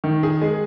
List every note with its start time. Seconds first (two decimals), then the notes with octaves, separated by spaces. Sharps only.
0.04 D#3
0.23 G#4
0.42 G#3